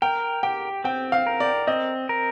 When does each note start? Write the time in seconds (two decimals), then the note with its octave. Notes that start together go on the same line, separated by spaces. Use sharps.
0.02 A#4 G5
0.43 G4 G5
0.84 C4 G5
1.12 F5
1.27 A#4
1.40 D5
1.67 C4 D#5
2.09 A#4